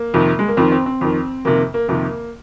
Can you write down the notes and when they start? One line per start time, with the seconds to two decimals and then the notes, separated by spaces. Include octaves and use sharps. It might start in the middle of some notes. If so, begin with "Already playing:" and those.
Already playing: A#3
0.14 F2 C3 D#3
0.39 G#3
0.48 A#3
0.57 F2 D#3 C4
0.72 C4
0.86 C4
1.01 F2 D#3
1.45 F2 C3 D#3 A#3
1.74 A#3
1.88 F2 C3 D#3 A#3